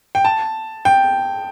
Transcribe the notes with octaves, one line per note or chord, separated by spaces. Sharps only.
G5
A5
G5